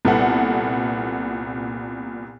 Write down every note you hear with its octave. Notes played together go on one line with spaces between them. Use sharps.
C2 A#2 B3 A4 F#5